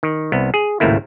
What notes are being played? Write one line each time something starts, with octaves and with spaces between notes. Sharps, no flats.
D#3
C2 B3
G#4
G#1 C#2 A2 A3 A#3 E4